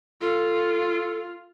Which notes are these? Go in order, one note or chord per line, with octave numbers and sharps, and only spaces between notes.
F4 A4